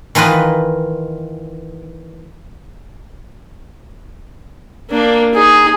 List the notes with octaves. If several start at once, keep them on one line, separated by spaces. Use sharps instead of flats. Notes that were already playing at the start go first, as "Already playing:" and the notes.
D#3 E3 F4 B4 D#5
A#3 D4
D#4 G#4